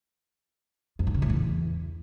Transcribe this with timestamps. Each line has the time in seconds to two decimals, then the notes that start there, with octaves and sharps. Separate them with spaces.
0.99 F2
1.07 A2
1.14 C#3
1.22 A2
1.30 E2